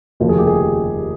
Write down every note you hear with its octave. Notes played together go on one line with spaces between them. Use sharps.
F1 D#2 C#3 F3 A#4
G#4
G4
G#4